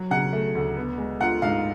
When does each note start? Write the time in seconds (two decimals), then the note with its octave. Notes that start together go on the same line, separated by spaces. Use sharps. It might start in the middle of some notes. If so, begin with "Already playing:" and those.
Already playing: F#3
0.11 C#3 F#5
0.33 A3
0.55 D2
0.77 B3
0.98 G#3
1.20 F4 F#5
1.42 G#2 F5